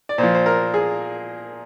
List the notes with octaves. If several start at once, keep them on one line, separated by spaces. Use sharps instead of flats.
D5
A#2 F3 C5
C5
A#4
G#4